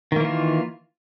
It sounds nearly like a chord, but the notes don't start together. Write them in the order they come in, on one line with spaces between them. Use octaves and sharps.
D#3 A#3 E3 F4